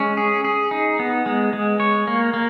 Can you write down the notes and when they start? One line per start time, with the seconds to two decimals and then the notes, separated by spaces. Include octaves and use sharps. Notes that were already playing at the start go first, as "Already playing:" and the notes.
Already playing: G#3 C#4
0.17 G#4
0.45 G#4
0.71 D#4
0.99 B3
1.26 G#3
1.53 G#3
1.80 C#5
2.07 A#3
2.34 A#3